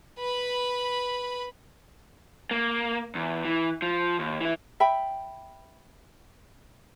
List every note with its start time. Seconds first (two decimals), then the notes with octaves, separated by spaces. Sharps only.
0.19 B4 B5
2.51 A#3
3.15 E2
3.45 E3
3.82 F3
4.19 D#2
4.41 E3 E4
4.80 E5 G5 B5